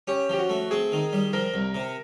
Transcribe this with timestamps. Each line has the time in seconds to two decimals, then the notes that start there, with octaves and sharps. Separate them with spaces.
0.08 C#4 G4
0.29 F3 G4
0.39 F#4
0.49 A3
0.71 C4 G#4
0.92 D#3
1.13 G3
1.33 F3 A#4
1.54 C2
1.75 C3